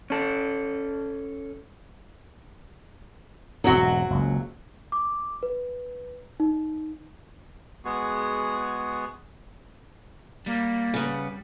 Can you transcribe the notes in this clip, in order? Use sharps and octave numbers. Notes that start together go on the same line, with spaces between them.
C#4 A4
E1 G#2 F#3 C4 F#4
F#1 C#2
D6
B4
D#4
G#3 B3 F#4 G#4
G3 A#3
C#3 B3